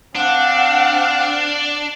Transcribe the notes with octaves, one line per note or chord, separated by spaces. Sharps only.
C4 D4 F5 F#5 D6